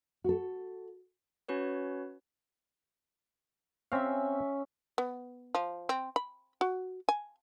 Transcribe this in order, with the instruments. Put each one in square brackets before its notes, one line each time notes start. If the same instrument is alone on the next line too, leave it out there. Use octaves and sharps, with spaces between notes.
[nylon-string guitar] F#4 A4
[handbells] C#4 F#4 B4 C#5
[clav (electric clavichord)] C4 F5 [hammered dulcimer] C#4 E5
[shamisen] B3
F3
C4
B5
F#4
G#5